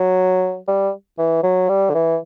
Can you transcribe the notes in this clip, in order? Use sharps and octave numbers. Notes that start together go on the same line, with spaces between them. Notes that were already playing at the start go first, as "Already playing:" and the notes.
Already playing: F#3
G3
E3
F#3
G3
D3
E3